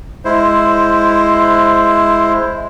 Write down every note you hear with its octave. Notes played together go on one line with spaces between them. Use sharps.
G#3 E4 C5